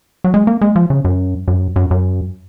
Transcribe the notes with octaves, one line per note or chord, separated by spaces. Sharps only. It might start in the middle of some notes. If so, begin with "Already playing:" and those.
F#3
G#3
A#3
G#3
F3
C#3
F#2
F#2
F#2
F#2